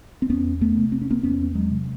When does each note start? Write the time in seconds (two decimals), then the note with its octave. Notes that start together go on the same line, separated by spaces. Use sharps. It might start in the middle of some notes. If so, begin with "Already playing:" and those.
0.22 C4
0.29 E2 B3 C#4
0.61 A3 B3
0.77 C3
0.92 C4
1.02 C#4
1.11 A#3 C4
1.23 E2 B3 C#4
1.55 F#3 G#3
1.71 C3